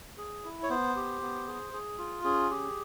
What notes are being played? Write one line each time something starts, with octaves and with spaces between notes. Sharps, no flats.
G#4
E4
C#5
B3 C5
G4
B3
G#4
G#4
F4
C#4 G#4
G4